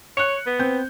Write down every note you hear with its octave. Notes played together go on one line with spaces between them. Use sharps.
C#5 F#6 C#7
B3
C4 G6